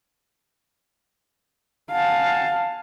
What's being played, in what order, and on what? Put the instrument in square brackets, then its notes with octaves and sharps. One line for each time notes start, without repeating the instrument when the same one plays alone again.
[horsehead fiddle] F5 [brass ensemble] F#5 G#5 A5